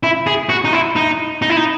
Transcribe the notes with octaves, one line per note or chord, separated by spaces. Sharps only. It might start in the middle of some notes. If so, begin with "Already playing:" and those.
E4
G#4
F#4
D#4
E4
D#4
D#4
E4
D#4